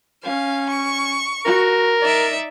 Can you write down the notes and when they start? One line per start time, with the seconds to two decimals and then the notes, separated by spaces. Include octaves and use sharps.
0.23 C#4 F5
0.70 C#6
1.45 F#4 A#4
2.01 D#4 D5 E5